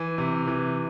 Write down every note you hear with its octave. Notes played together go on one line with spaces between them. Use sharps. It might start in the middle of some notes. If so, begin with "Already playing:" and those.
Already playing: E3
C3
E3